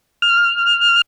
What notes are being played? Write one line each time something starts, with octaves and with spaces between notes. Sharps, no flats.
F6